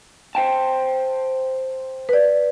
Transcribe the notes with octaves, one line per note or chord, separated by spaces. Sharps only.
C5 G5 A5
B4 D5